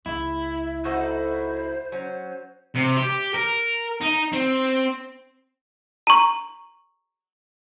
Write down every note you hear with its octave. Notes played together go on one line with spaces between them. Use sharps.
C#2 E4
D#4 F#4 A4 C5
F#3 C#4
C3
G4
A#4
D#4
C4
A#5 C#6